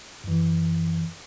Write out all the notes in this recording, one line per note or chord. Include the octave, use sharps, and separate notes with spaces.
F#2 E3